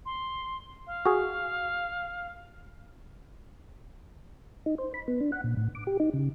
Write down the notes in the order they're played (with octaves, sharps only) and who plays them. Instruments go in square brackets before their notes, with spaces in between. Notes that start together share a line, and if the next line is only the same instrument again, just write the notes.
[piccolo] C6
F5
[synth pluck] F#4 G#4
[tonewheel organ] D#4
C5
B5
B3
D4
F#5
A#2
A2
D6
G4
D#4
C#3